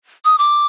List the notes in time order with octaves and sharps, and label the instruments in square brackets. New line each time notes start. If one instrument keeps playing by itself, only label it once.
[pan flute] D#6
D6